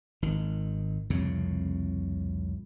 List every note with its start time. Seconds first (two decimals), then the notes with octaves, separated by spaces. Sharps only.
0.22 G#1 D#3
1.10 C2 F2 A2 C#3